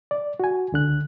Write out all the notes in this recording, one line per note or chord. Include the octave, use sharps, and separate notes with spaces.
D5
F#4 G#5
C#2 D3 F#6